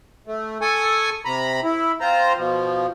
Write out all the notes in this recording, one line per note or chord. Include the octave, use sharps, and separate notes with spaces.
A3
A4 G#5 C#6 D#6
C3 A#5 B5
E4
C4 F4 C5 A#5
B2 F3